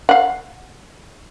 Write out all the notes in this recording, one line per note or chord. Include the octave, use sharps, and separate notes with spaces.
F5 F#5